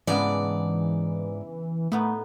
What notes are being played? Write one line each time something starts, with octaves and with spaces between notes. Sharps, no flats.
G#2 C#3 E3 B3 D4 D5
A2 A3 B3 D#4